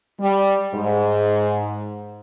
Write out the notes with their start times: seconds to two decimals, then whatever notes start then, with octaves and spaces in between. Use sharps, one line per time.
0.20 G3
0.75 G#2